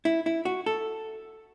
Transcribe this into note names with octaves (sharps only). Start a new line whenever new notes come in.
E4
E4
F#4
A4